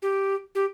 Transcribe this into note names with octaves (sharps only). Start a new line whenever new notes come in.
G4
G4